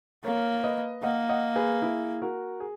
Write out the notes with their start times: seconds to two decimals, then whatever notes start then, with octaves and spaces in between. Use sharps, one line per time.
0.24 A#3 A#4 C#5
0.64 B4 D#5
1.03 A#3 D#5 F#5
1.29 D#5 F#5
1.56 G#4 B4
1.82 E4 G#4
2.22 F#4 A#4
2.60 G#4